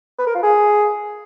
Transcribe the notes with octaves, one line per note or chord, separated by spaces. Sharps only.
B4
A#4
F4
G#4